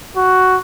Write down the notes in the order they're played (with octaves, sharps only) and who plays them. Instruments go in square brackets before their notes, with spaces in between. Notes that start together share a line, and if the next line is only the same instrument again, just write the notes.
[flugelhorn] F#4